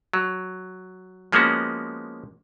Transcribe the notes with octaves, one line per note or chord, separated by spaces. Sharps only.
F#3
F3 G#3 A#3 B3 C#4 F#4